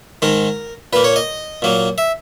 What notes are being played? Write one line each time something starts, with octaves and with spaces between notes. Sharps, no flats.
G#2 D#3 G#3 A#4
A#2 A#3 B4
C#5
D#5
A#2 F#3 A#3
E5